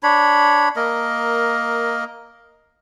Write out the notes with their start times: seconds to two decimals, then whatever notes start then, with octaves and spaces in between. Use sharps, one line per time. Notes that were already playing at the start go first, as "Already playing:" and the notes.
0.03 D4 C#5 B5
0.76 A#3 A#4 D#5